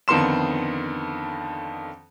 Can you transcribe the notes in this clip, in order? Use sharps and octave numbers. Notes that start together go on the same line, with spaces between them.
F2 D3 D#3 B3 C6 E7